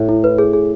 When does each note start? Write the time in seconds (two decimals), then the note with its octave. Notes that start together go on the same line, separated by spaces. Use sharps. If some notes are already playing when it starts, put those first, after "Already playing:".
Already playing: A2
0.09 E4
0.24 B4
0.38 G#4
0.53 G#4